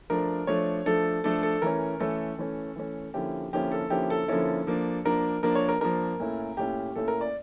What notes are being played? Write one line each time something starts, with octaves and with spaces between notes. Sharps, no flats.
F3 A3 D4 A#4
F3 A3 D4 C#5
F3 A3 D4 A4
F3 A3 D4 A4
A4
E3 A3 C#4 A#4
E3 A3 C#4 A4
E3 A3 C#4
E3 A3 C#4
D3 F3 A#3 C#4 E4 G4
D3 F3 A#3 C#4 E4 G4
A4
D3 F3 A#3 C#4 E4 G4
A4
D3 F3 A#3 C#4 E4 A4
F3 A#3 D4
F3 A#3 D4 A#4
F3 A#3 D4 A#4
C#5
A#4
F3 A#3 D4 A#4
A#2 A3 C#4 E4
A#2 A3 C#4 E4 G4
A#2 A3 C#4 E4 A4
A#4
D5